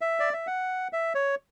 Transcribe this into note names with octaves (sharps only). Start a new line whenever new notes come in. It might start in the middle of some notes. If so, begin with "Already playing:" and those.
E5
D5
E5
F#5
E5
C#5